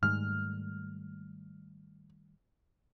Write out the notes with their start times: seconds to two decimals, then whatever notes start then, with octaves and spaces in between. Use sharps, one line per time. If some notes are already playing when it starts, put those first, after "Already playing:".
0.03 G#2 D#3 G3 A3 F6